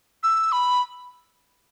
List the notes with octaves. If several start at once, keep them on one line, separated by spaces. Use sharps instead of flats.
E6
B5